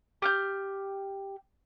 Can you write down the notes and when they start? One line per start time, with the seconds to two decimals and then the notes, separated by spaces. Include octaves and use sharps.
0.22 G4 F6 G6